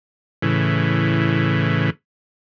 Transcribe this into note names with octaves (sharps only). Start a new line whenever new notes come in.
A2 C#3 E3